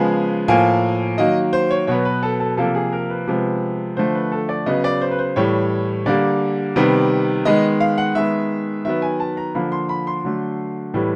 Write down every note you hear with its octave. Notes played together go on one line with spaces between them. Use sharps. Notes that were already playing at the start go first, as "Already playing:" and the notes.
Already playing: C#3 F3 G#3 B3 G#5
A2 F3 A#3 G#5
D#3 F#3 A#3 D#5
C5
C#5
B2 F#3 B3 C#5
B4
A4
A4
C3 F3 A#3 A4
G#4
A#4
B4
C3 F3 G#3 B3
D3 F3 A3 C5
B4
A4
D5
C#3 F#3 B3 D#5
D5
C5
B4
C5
A2 E3 G3 C#5
D3 G3 A#3 D5
C3 D#3 G3 B3
D#3 G#3 B3 D#5
F5
F#5
D#3 G#3 B3 E5
D#3 F#3 B3 E5
G#5
A5
A#5
D3 F3 A#3 B5
C6
B5
C6
D3 F#3 A3
A2 E3 G3